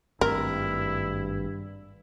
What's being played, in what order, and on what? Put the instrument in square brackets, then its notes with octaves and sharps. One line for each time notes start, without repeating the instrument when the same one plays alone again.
[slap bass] G#1 A3 C4 [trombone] G2 [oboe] E4 [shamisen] A#4